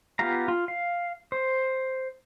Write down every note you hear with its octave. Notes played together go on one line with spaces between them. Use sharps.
B3 F4 G4 F5 A#5
F4
F5
C5